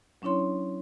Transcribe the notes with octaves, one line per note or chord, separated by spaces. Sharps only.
F#3 C#4 D4 E4 C#5 C6